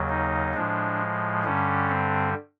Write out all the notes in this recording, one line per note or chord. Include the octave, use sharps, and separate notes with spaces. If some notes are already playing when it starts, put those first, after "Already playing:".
Already playing: D#2 C#3 F#3
D#4
A2 F3 G#3 D4
G2 D3 G3 C#4
C4